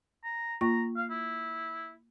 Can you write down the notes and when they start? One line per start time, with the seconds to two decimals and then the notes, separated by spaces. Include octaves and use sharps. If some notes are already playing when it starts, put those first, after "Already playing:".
0.24 A#5
0.61 A#3 F4 A#5 C#6
0.96 F5
1.10 E4